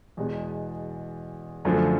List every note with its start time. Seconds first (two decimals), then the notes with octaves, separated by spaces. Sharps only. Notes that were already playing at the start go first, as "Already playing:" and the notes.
0.17 E2 B2 G#3
1.65 F#2 D3 F3 A3